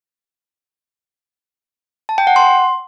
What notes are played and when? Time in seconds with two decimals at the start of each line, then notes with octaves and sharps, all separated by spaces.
2.09 A5
2.18 G5
2.27 F#5
2.36 C6